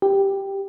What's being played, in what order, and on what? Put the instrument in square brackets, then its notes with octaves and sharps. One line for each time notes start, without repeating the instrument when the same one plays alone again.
[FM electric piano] G4